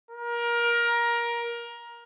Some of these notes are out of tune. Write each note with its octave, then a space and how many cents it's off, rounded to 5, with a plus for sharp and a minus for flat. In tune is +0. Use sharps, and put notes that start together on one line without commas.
A#4 +20